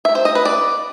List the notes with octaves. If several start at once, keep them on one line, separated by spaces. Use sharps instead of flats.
E5
C5
D#5
B4
D5